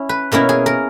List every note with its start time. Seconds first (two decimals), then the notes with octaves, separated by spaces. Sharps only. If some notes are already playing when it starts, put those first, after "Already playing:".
Already playing: C#4 E4
0.09 B4
0.32 B2 A#3 C#4 E4 A#4
0.49 G#4
0.66 A#4